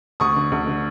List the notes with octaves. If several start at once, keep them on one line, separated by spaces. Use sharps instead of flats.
D2 C#6 D#6
D3
D2
D3